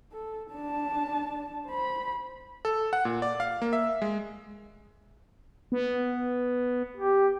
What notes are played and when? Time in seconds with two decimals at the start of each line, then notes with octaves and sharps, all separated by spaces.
0.12 A4
0.52 D4 A5
1.67 C5 B5
2.65 A4
2.93 F#5
3.05 A#2
3.22 D5
3.40 F5
3.62 A#3
3.73 E5
4.02 G#3
5.72 B3
6.97 G4